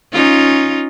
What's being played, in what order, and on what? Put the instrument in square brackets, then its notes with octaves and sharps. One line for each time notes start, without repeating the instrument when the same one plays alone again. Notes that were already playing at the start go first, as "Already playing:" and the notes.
[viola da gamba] C#4 D#4 F4